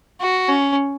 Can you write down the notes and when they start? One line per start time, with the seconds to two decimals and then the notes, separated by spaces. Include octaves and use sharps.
0.20 F#4
0.48 C#4